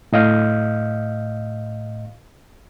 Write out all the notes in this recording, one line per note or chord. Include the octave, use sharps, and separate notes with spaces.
A2 D#5 F5 G6